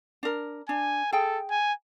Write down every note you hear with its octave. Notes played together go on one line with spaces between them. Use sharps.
D4 A#4
D4 G#5
G#4 A4 G5
G#5